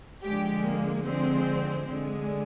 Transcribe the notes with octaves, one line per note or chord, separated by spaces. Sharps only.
D3 F3 G#3 G4
A#3
D3 F3 G#3 C4
D3 G#3